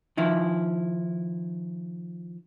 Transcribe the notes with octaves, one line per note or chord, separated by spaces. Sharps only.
D#3 F3 E4